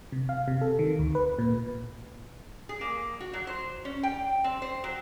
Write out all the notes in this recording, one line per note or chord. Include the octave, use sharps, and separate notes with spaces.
C3
F5
C3
A4
D#3
D2
B4
A#2
G#4
A#3
F#4
F#3
C5
C#4
G5
C4
C5
F#3